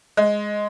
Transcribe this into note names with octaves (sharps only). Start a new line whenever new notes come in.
G#3